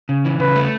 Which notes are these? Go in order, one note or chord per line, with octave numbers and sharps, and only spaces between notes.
C#3
E3
C#3 B4
A3